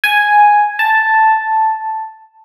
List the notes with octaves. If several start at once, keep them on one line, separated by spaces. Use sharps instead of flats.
G#5
A5